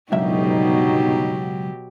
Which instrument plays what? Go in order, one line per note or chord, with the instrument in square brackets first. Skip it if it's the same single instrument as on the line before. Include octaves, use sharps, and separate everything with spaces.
[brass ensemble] G1 D#4 [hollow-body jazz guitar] C#2 F#2 E5 [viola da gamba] B2 F#3 G4